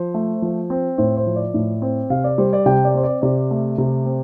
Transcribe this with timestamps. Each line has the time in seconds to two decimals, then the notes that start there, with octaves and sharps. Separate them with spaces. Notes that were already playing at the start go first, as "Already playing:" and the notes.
Already playing: F3 C5
0.14 A3
0.42 F3
0.70 C4
0.98 A2 C5
1.17 C5
1.27 F3
1.36 D5
1.54 A2
1.82 C4
2.10 C3 F5
2.24 D5
2.38 G3 C5
2.53 D5
2.66 C3 G5
2.85 D5
2.94 C4 C5
3.03 D5
3.22 C3 D5
3.51 A3
3.78 C3
4.06 C4